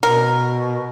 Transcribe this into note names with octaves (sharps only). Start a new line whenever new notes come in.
B2 A#4